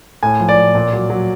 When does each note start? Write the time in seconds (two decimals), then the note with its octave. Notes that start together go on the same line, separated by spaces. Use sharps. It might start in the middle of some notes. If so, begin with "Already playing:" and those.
0.23 A2 G#5
0.40 F3
0.49 D5
0.58 A2
0.75 A#2
0.93 F#3
1.10 F#3